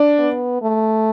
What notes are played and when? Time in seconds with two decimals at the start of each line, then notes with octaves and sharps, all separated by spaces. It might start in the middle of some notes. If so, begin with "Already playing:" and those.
Already playing: D4
0.18 B3
0.62 A3